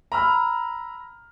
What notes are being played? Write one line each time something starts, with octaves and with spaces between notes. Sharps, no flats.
A#5 B5 E6 F6